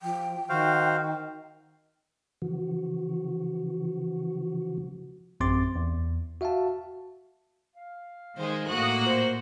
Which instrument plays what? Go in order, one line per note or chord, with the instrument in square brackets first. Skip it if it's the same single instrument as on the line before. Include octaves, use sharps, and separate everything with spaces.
[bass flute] F3 [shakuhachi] G5
[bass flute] D#3 [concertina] F#4 C5 F5
[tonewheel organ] C#3 E3 F3 F#4
[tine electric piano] A1 F#2 C4 C6 D6 A6
E2
F#4 E5 F5 G5 A5
[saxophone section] F5
[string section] D#3 G#3 [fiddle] C5
[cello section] A2 A#3 [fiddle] F#4 [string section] D#6 F#6
[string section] A#2 [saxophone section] F4 C5